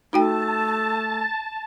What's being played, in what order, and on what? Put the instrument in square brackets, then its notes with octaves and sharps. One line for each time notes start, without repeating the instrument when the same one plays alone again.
[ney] A3 [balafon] D#4 F#4 G5 [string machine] A5